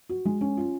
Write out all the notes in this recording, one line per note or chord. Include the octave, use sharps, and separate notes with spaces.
F#4
G#3
C#4
F4